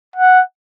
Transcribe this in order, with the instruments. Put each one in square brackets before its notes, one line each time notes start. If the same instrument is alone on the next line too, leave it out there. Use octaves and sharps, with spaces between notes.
[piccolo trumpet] F#5